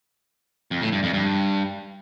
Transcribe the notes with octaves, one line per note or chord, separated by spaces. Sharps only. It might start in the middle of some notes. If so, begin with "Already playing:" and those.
F2
A2
G2
F2
G2